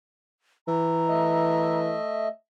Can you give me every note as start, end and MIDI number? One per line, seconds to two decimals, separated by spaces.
0.68 1.97 52
0.68 1.79 82
1.09 2.28 57
1.09 2.28 75
1.09 2.28 76